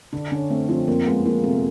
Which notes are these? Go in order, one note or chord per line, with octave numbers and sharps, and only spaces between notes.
D3 D4
D3 C#4
A3 C4
F3 C4
F2 A#3
G#3 B3
F3 A#3
C3 A3